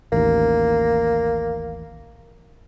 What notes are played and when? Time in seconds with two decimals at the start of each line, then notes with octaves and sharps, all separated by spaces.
0.12 A1 D#2 A#3